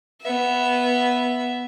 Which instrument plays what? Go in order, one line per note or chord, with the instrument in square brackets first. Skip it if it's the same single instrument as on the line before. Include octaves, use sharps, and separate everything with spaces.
[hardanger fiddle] B3 E5